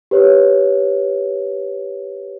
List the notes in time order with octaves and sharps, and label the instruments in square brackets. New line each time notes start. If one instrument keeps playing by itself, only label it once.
[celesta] G4 B4 C#5